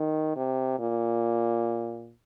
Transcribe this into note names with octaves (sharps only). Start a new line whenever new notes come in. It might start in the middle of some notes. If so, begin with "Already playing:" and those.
Already playing: D#3
C3
A#2